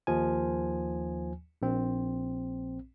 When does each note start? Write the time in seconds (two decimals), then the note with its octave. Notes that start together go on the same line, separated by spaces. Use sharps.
0.07 D#2 F3 G#5
1.62 A#1 C4